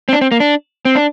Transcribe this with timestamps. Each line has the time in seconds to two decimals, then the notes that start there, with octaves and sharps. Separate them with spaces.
0.09 C4
0.13 D4
0.21 C4
0.32 A#3
0.40 D4
0.85 C4
0.95 D4